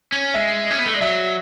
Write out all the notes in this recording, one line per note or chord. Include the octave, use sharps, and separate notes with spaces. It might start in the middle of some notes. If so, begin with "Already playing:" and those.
C#4
G#3 E5
C#4
B3
A3
G#3 D5
F#3 E5